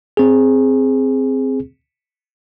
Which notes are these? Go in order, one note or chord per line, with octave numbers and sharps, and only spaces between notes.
C4 G#4